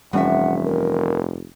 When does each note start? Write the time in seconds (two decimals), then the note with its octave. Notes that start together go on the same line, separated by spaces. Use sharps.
0.13 F1 G2 E3 G3 C#4 E5 F#5
0.65 A#4